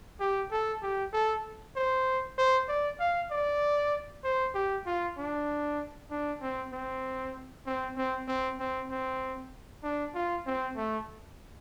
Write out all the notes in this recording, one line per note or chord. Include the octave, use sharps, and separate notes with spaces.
G4
A4
G4
A4
C5
C5
D5
F5
D5
C5
G4
F4
D4
D4
C4
C4
C4
C4
C4
C4
C4
D4
F4
C4
A3